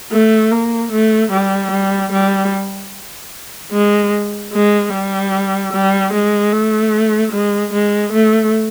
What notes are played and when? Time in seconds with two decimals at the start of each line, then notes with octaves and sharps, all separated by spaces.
0.12 A3
0.51 A#3
0.91 A3
1.31 G3
1.71 G3
2.12 G3
3.72 G#3
4.52 G#3
4.93 G3
5.72 G3
6.13 G#3
6.52 A3
7.32 G#3
7.72 G#3
8.12 A3